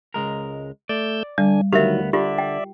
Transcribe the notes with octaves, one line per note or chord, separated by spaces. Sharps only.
C#2 G#3 A#4
A3 D5 E6 G6
D3 G3 D4 G#5
D2 D#3 F#3 B3 G4 A#4 E5 F5
D3 F4 G4 D5 E5
G5